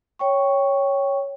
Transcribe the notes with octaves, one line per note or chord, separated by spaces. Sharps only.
C#5 G5 C#6